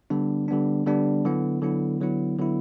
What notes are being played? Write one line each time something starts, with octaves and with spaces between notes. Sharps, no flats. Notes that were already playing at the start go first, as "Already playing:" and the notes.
D3 G3 B3 D4
D3 G3 B3 D4
D3 G3 B3 D4
D3 F#3 B3 E4
D3 F#3 B3 E4
D3 F#3 B3 E4
D3 F#3 B3 E4